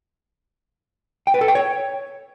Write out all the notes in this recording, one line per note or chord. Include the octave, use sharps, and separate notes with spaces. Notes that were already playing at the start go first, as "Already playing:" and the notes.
G5
B4
A4
G5
C#5